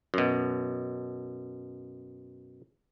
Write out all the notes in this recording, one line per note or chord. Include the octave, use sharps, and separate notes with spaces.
F#2 B2